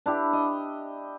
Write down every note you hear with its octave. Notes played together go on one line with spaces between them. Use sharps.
D4 E4 G4
D#5